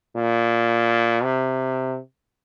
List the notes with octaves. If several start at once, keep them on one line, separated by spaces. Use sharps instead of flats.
A#2
C3